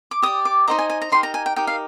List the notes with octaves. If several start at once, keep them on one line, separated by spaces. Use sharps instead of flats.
D6
G4 D5 D#6
D6
D#4 G4 C5 D#5 A#5
G#5
G#5
A#5
D#4 G4 A#4 C6
A#5
G#5
G5
D#4 G4 A#4 G5
F5